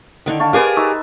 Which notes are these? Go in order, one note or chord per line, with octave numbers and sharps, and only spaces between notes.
D3 D#3
F5 A5 C#6
G4 G#4 A#4 B4 D5 F5
D#4 C#6 E6